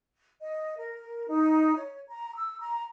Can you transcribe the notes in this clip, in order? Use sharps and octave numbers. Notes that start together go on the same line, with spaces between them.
D#5
A#4
D#4
C#5
A#5
E6
A#5